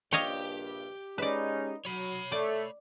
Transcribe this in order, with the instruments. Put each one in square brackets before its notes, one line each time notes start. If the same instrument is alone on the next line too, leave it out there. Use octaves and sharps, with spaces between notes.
[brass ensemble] A#1 G2 [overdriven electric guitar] G4 G5 [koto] C#5 D#5 F5
[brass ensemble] G#3 C#4 D#4 [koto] B4 D5
[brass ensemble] F#3 [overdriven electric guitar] C#5 B5
[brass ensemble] A3 [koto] D5